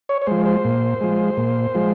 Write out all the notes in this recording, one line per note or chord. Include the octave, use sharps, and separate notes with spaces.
C#5
C#5
F3 G#3 C5
C5
A#2
F3 G#3
A#2
F3 G#3